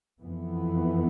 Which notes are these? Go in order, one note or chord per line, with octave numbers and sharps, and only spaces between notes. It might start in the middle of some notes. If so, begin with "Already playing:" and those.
F2 E3 B3